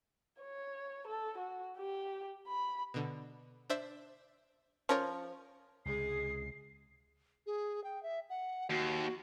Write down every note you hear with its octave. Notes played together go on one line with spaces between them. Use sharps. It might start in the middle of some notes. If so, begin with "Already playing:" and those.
C#5
A4
F#4
G4
B5
B2 D3
D4 C5 E5
F3 C#4 A#4 C#5
C#2 C3 G#3 G#4 C7
G#4
G5
E5
F#5
D#2 F#4